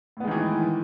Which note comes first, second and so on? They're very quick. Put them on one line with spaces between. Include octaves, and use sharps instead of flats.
A2 B3 G#3 D#3 E3